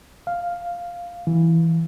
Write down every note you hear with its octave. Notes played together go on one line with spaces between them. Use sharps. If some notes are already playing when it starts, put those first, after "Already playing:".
F5
E3